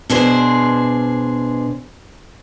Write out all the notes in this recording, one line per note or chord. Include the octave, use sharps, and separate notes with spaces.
B2 D4 G#4 C5